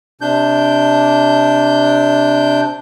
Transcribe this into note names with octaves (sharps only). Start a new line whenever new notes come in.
C3 D4 G6